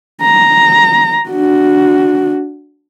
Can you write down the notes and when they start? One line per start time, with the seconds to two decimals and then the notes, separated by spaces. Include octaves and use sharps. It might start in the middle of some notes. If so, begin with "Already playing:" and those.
0.22 A#5
1.29 D4 F#4